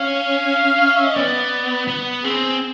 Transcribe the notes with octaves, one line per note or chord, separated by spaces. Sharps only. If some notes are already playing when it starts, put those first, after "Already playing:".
Already playing: C#4 F5
F5
E5
D#5
B3 D5
B3
C4 G#4